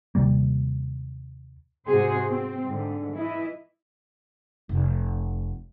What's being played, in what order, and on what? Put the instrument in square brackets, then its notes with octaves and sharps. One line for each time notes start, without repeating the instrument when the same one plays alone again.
[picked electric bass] D#2 C3 G3 A#3
[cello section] G#2 C3 F#4 G#4 C5
C4
G#2 D3
E3 E4 D#5
[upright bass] F1